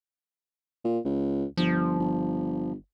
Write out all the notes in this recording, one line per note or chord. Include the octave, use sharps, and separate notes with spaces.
A#2
C#2
G1 F3
G1